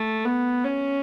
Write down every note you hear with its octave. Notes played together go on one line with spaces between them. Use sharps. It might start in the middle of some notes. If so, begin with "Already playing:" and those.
Already playing: A3
B3
C#4